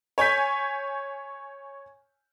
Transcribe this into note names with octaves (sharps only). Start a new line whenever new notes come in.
C#5 G#5 G6 B6